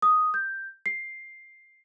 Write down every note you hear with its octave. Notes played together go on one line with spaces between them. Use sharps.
D#6
G6
C7